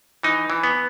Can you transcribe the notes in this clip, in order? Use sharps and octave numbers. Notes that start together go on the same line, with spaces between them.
E3 D#4
E3
B3